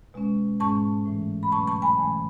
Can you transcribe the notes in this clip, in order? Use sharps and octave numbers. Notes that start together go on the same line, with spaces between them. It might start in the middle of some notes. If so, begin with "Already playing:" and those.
B2 G#3 C#4
G#2 G#3 C#4 A5 C#6
A2 E3 A3
B5
B2 F#3 A3 C#4 A5 C#6
A5 C#6
G#5 B5
C#3 E3 A3 C#4